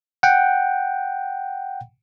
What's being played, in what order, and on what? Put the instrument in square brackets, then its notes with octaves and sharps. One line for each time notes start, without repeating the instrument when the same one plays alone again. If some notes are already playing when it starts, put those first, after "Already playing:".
[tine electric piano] F#5 G5